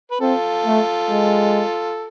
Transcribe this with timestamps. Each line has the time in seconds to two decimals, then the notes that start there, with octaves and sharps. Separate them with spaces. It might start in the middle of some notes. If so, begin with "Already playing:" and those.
0.11 B4
0.21 C4 F4 A4
0.66 A3
1.10 G#3